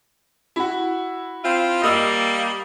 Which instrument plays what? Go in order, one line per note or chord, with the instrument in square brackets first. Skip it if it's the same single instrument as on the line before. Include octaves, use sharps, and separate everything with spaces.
[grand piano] E4 F#4
[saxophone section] C4 E4 F4
[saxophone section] G3 A#3 [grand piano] D#5 D#6 E6